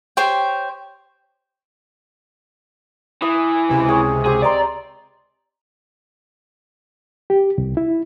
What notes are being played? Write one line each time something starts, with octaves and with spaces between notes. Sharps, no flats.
G4 C5 C#5 G5
E3 D#6
C#2 C3
G#4 C#5
C4 G4 G#4
D5 D#5 A#5 C6
G4
C2
E4